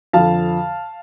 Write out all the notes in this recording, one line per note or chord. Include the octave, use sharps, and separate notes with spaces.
F2 D3 F3 F5 A5